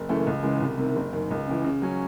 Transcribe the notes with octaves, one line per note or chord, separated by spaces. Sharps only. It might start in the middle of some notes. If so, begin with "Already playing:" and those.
Already playing: F#1
F#2 C#3 E3 A3
C#2
C#3 E3 G#3
C2
C3 D#3
F#1
F#2 D#3
C#2
C#3 E3
C#3
F#3 C#4